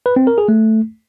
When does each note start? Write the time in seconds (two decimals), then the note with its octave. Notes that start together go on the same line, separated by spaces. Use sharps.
0.06 B4
0.16 C4
0.27 A#4
0.38 G#4
0.48 A3